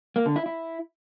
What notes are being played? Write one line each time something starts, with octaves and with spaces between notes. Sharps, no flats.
A#3
D3
E4
E4